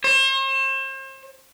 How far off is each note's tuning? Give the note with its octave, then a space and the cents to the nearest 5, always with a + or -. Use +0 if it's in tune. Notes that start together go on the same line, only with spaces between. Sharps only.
C5 +40